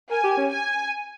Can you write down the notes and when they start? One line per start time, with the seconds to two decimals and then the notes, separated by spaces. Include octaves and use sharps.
0.10 A#4 G#5
0.24 G4
0.37 C#4
0.49 G#5